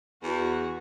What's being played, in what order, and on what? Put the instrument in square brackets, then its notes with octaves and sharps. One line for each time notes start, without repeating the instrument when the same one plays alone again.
[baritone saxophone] E2 [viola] F#4